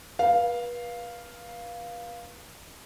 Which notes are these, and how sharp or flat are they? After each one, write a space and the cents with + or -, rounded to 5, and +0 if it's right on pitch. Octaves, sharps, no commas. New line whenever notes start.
B4 -35 F5 +0